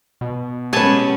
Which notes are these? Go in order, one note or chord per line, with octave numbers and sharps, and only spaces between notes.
B2
F#3 G#3 C#4 G4 B4 G#5 A5